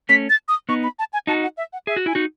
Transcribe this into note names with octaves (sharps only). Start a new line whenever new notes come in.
A3 C#4 B6
A6
D#6
B3 D#4 C#6
B5
A5
G#5
D#4 F#4 A5
F#5
E5
F#5
G#4 E5
F#4
E4 G#5
D#4 F#4